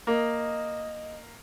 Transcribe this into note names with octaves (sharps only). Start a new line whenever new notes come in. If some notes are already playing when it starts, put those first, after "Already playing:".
A#3 D#5